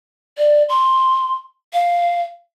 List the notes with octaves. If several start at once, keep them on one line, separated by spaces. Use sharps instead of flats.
D5
C6
F5